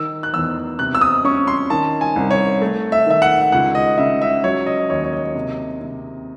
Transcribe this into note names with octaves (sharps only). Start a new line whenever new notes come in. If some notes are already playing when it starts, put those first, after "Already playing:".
Already playing: D#3 E6
F#6
E2 E6
C3 F#6
E6
D#6
C#4 C#6
C6
D#3 A5
G#5
C2
C#5
A3
E5
D#3 E5
F#5
C#2 F#5
D#5
C#3 E5
E5
F#3 C#5
D#5
D#2 C#5
C#5
D#5
C3
C3